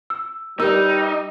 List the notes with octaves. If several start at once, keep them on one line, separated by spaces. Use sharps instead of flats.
E6
G3 D#4 A#4 B4 E6